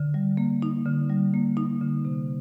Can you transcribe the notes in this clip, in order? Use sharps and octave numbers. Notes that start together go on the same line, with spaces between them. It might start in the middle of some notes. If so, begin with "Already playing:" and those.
Already playing: D3
G3
A#3
D#4
D3
G3
A#3
D#4
D3
C3